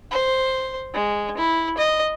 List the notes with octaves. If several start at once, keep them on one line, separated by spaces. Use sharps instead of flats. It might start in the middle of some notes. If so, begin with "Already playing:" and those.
C5
G#3
E4
D#5